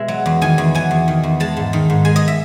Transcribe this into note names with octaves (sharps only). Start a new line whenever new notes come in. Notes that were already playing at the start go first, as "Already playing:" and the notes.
Already playing: B2 G#3 E5
F#3
E2
D#3 G#5
E2
F#3 G#5
E2
D#3
E2
G#3 A5
G#2
D#3
G#2
G#3 G#5
D#5
E5